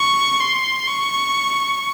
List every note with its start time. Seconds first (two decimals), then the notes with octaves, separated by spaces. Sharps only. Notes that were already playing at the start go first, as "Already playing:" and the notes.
Already playing: C#6
0.40 C6
0.88 C#6